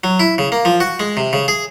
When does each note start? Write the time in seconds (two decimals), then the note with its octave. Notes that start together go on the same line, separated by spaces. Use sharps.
0.04 F#3
0.20 E4
0.38 C#3
0.52 A#3
0.65 F3
0.80 F#4
1.00 G#3
1.17 C3
1.33 C#3
1.48 G#4